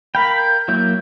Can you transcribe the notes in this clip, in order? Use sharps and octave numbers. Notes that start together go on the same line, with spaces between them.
A#4 F5 G5 B5
G6
F#3 A#3 E4